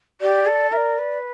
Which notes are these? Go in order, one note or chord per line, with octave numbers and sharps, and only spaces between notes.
G4 D5
A4
A#4 D5 E5
B4